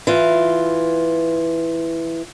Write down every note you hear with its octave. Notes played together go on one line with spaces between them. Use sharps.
E3 F4